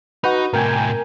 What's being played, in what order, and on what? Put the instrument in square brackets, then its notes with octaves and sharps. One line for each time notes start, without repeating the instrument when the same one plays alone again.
[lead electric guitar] D#4 [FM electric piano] F#4 B4
[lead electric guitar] A2 C3 [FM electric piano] A#4 G5 G#5